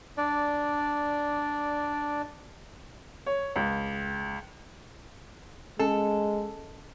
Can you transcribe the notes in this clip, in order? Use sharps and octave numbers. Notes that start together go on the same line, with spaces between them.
D4 D5
C#5
C#2
G#3 C#4 A4